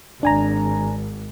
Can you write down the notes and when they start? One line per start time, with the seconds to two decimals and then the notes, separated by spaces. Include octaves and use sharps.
0.23 G#1 D4 G#5 A#5